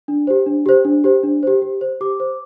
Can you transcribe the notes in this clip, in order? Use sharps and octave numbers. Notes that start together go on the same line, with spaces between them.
D4
G4 C5
D4
G4 C5
D4
G4 C5
D4
G4 C5
G4
C5
G4 D6
C5